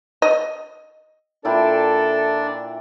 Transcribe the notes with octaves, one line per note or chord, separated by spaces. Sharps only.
D#5
A#2 D4 E4 A4 D5 G5